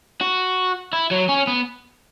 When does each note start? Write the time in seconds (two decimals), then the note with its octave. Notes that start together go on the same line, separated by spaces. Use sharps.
0.21 F#4
0.93 E4
1.11 F#3
1.29 C#4
1.47 B3